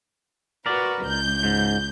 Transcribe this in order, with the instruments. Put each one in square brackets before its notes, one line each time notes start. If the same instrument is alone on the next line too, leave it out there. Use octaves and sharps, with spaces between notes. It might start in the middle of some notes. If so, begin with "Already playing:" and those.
[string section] F#4 B4 [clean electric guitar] A#4 D5
[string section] C#2 G6
[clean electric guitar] G#2